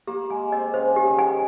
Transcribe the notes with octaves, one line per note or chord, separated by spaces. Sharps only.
A#3 G4
G#3 G#5
C4 D#5
C#3 C5
G4
D#3
G#5